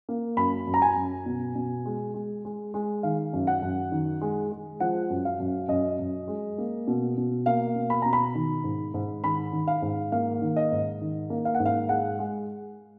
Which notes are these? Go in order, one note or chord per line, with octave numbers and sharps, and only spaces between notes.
A#3
F#2 B5
F#2
A#5
G#5
F#2
B2
B2
G#3
G#3
G#3
G#3
D#3 F5
F#2
F#5
F#2
D#3
G#3
G#3
F3 F#5
F#2
F5
F#2
F#2 D#5
F#2
G#3
A#3
B2
B2
A#3 F5
B2
B5
B2 A#5
B5
D#3
G#2
G#2
D#3 B5
D#3
F5
G#2
A#3 F5
D#3
D#5
G#2
D#3
A#3
F5
F#5
G#2
F5
G#3 F#5
G#3